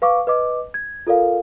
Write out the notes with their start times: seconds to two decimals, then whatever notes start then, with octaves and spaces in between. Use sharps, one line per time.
0.02 B4 F5 C#6 D6
0.27 B4 D#5 D6
0.74 G#6
1.07 F4 A4 A#4 D5 F5